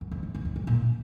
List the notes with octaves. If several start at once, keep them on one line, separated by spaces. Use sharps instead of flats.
F#2
F2
F2
F#2
F2
F#2
A#2